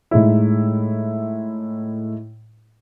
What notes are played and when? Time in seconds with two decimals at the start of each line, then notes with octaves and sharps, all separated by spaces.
0.11 A2 G#3 D#4 E4